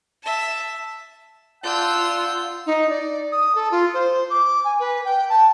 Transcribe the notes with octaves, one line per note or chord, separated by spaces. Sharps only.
E5 A5
F4 D5 F#5 A5 E6 G6
D#4
D5
D#6
A4
F4
C5
D6
G#5
B4
G5
A5